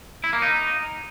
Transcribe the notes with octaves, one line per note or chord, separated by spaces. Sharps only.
E4
A#3
D#4